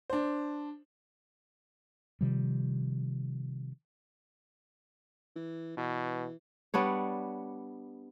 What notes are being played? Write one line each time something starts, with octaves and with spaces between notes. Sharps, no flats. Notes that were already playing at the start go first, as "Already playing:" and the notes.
D4 C5
C3 D#3 F3 G3
E3
B2 E3
G3 B3 D4 C#5